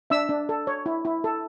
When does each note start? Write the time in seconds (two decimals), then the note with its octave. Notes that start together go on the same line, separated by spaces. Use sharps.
0.10 D4 E5 E6
0.29 D4
0.49 A4
0.67 C#5
0.86 E4
1.05 E4
1.24 A4